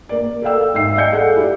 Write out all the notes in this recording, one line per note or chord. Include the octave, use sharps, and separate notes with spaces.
A#3 D5
A4 A#4 D5 F5 G5 E6
G#2 E5 G5 E6 C7
D5 D#5 F5 G#5 G6 C#7
G#4 A4 D5 F5 F#5
E4 G4 D5